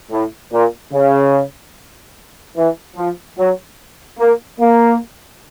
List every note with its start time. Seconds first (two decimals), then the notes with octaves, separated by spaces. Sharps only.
0.11 A2
0.52 A#2
0.92 C#3
2.56 E3
2.96 F3
3.38 F#3
4.19 A#3
4.59 A#3